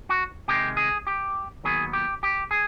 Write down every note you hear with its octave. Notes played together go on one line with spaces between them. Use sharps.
F#4
C3 D#3 G#3 G4
G#4
G4
D#2 D#3 F#3 B3 G#4
G4
G4
G#4